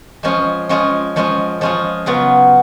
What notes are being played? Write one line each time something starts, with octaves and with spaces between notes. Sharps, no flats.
F3 G#3 C#4 F4 G#4
F3 G#3 C#4 F4 G#4
F3 G#3 C#4 F4 G#4
F3 G#3 C#4 F4 G#4
C#3 F#3 B3 F4 G#4